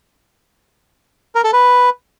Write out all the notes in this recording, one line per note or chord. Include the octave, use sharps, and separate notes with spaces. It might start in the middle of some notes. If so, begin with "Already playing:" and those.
A#4
A4
B4